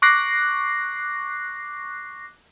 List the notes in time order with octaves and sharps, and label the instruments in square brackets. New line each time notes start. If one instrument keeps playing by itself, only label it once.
[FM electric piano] C#6 D6 F#6 A#6 C7